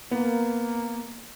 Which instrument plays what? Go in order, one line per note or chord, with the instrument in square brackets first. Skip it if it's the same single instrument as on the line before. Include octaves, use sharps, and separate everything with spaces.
[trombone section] A#3 [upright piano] B3